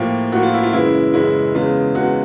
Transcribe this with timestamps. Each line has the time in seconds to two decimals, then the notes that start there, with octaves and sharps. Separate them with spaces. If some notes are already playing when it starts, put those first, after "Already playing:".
Already playing: A2 F3 A#3 G4
0.32 A2 F3 A#3 F#4
0.43 F4
0.54 E4
0.63 F4
0.73 F#2 C#3 E3 G#3 E4
1.14 F#2 C#3 E3 G#3 E4
1.55 E2 C#3 E3 G#3 F4
1.95 E2 C#3 E3 G#3 F#4